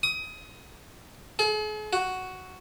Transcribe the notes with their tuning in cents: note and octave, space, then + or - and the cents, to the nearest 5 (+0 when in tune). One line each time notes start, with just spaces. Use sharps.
D#6 +20
G#4 +45
F#4 +5